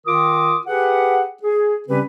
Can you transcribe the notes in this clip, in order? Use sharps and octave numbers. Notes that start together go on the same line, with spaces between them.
D#3 F4 A#4 D6 D#6
G4 G#4 B4 F#5
G#4
C#3 G3 C4 C#4 G4 B4